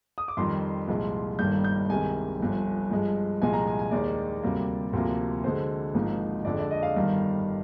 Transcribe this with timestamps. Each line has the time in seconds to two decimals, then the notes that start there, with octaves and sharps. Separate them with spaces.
0.18 D#6
0.28 D6
0.37 F2 D#3 G3 C6
0.88 C2 A#2 F3 G#3
1.39 G1 G2 D#3 G3 A#3 G6
1.64 G6
1.89 C2 C3 D#3 G#3 G#5
2.39 G1 G2 F3
2.91 G2 F3 G#3
3.42 C2 A#2 F3 G#3 G#5
3.53 A#5
3.67 G#5
3.79 G#5
3.91 D#2 D#3 G#3 D5
4.43 D2 C3 G3 A#3
4.93 D2 C3 F3 A#3
5.44 D2 D3 G#3 C5
5.94 G#1 G#2 F3 A#3
6.45 F2 D3 G#3 D5
6.58 D5
6.71 D#5
6.83 F5
6.96 G1 G2 D#3 G3